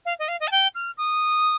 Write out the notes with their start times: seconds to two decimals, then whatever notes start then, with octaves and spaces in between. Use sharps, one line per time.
0.05 F5
0.19 D#5
0.28 F5
0.40 D#5
0.47 A5
0.51 G5
0.74 F6
0.97 D#6